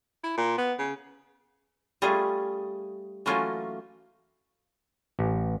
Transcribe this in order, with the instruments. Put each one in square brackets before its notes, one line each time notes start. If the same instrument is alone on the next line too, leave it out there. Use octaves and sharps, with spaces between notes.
[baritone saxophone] E4
A#2
B3
C#3
[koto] G3 A3 C#4 F4 G#4
E3 F#3 A3 A#3 C#4 F4
[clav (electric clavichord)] A1